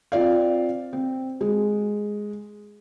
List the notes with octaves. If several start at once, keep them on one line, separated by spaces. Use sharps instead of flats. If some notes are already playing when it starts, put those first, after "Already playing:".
C4 F4 D5 F5
C4
G#3